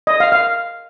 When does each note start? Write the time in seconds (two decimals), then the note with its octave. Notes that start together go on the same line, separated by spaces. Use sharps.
0.07 D#5
0.20 F5
0.32 F5